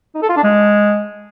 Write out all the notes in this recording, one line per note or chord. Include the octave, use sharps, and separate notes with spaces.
D#4
A4
F4
D4
G#3